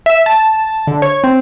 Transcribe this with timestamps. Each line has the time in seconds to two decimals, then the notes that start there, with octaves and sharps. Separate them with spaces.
0.06 E5
0.26 A5
0.87 D3
1.02 C#5
1.24 C4